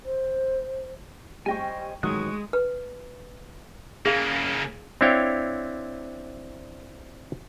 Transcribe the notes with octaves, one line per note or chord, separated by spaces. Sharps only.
C5
G3 C5 D#5 G5 G#5 C#6
A1 D#3 F#3 G#3 C#6 D#6 F#6
B4
C#3 A#3 G#4 F5
C4 D4 E4 C#5 F5 G5